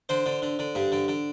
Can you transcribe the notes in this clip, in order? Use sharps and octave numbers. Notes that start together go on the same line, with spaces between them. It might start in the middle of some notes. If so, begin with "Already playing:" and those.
D3 C5
D3
D3
D3
G2
D3
D3